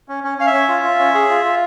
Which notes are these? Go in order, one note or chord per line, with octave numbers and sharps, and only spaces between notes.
C#4
C#4
C#4 F5
E5
C#4
F4
F4
C#4
G#4
F4
F4